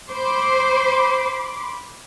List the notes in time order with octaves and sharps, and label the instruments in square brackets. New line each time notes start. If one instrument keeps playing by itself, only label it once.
[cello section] C5 [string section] B5 C6 D6